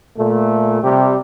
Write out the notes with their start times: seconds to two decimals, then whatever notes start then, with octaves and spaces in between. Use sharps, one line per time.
0.17 A#2 A3
0.82 C3 G3 G4